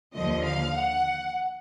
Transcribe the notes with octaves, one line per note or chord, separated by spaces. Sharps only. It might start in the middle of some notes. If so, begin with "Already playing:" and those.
D#2 D3 F3 D#5
F5
F#5